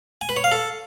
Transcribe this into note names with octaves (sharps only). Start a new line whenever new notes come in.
G#5
B4
C#5
F5
A4